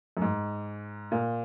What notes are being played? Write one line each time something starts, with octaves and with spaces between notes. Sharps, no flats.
F#2
G#2
A#2